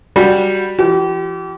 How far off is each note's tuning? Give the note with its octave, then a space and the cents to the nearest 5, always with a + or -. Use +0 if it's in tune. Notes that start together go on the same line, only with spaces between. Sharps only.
G3 +0 F#4 +0
F3 -45 G4 -35